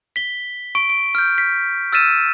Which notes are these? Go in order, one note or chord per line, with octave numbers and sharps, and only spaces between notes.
B6 G7
C#6 D7
D7
F6 G6
B6
E6 F6 A6 B6 D#7 E7